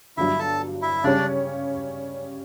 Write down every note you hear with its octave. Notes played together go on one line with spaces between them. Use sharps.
G1 G2 F#3 E4 E5
A4 A5
E4 E5
C#3 G3 C#4 D4 D5